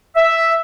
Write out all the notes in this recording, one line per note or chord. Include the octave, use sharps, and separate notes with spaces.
E5